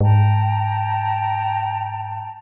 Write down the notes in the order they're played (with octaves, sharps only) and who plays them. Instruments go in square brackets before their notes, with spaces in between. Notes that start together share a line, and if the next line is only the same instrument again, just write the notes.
[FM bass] G#2 [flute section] G5 A5 A#5